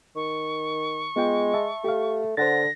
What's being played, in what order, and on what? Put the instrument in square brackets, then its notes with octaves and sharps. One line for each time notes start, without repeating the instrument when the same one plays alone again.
[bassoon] D#3 [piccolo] C#6
[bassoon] G#3 [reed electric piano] B3 F4 G5
[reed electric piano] E5 A5
[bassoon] A3 [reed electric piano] G4 F5
[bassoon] D3 [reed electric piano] C5 F#5 A6 [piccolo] A#6